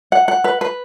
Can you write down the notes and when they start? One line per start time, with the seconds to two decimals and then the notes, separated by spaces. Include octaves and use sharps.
0.12 F#5
0.28 F#5
0.44 B4
0.61 B4